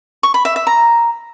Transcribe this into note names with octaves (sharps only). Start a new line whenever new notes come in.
C#6
B5
E5
E5
A#5